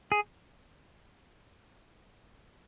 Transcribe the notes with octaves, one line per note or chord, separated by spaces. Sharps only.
G#4